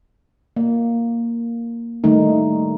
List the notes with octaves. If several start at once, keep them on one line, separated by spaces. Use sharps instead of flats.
A#3
D#3 G3 A3 D#4